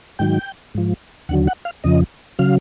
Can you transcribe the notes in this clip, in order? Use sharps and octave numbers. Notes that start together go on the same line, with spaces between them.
G#2 D#3 F#3 G5
G#2 F3
D#2 D3 F#3 F#5
F#5
F5
F2 C#3 F3 D#5
C#3 F#3 F5